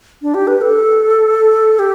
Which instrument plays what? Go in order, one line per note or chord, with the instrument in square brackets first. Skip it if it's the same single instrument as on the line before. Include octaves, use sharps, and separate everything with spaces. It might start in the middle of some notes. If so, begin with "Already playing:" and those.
[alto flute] D4
G4
B4
A4
G4